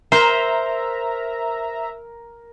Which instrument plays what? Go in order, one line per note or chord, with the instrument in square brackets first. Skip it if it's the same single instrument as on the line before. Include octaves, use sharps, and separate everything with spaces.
[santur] A#4 [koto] C5 [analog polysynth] E5 A#5